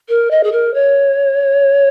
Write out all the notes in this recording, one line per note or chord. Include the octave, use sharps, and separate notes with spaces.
A#4
D#5
G#4
A#4
C#5